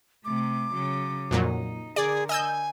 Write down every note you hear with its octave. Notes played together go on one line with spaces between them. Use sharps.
C3 A3 D6
C#3 F#3
F2 A#2 F#3 D#4
D3 G#4 A#4 D5
D#5 G#5 E6 G6